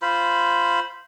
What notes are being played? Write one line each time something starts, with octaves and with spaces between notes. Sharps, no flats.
F4 C5 B5